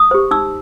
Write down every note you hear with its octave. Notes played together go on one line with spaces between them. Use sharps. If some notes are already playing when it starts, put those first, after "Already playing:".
Already playing: D#6
G4 C5
D#4 E6